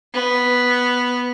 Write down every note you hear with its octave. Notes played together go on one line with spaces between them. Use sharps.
B3